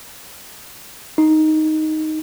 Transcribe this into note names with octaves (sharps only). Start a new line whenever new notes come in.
D#4